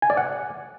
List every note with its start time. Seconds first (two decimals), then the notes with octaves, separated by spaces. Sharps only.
0.02 G#5
0.10 D5
0.17 F#5